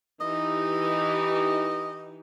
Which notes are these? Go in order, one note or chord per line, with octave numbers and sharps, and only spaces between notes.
E3 D#4 G4 D#5